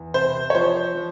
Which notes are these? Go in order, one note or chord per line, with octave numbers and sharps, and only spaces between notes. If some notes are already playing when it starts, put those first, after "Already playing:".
Already playing: E2
C3 C5
C#5
F3 C5
F3